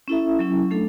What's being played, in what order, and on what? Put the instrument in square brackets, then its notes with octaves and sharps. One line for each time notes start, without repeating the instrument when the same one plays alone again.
[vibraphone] C#4 E4 A4 E5
F#3 C#4 E4
A3 D4 A4